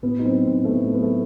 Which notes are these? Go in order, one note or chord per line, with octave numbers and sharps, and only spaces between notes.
A2 B3
D#4
F#3 C4
A2 C4
A3
A2 B3
F#3 B3
A3